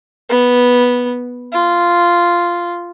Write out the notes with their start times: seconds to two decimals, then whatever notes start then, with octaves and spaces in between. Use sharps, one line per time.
0.29 B3
1.52 F4